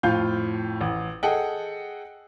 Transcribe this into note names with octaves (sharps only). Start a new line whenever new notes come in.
F2 A2 F4 F5 G6
A1
G#4 A4 D#5 F#5 G5